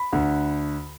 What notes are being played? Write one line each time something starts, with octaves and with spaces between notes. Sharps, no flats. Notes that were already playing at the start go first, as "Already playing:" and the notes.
Already playing: B5
D2 D3